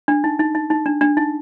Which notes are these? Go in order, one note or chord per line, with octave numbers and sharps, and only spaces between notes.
D4
D#4
D#4
D#4
D#4
D4
D4
D#4